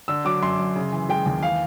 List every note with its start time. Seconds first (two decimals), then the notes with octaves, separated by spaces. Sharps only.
0.08 D3 E6
0.25 F#3 D6
0.42 F#2 C6
0.59 F#2
0.75 C#3
0.93 E3
1.09 G#3 G5
1.26 D#2
1.42 E3 F5